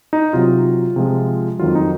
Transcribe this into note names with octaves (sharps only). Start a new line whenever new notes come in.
D#4
C3 F#3 F4
C3 F3 G#3
F2 D#3 F#3 F4
D#4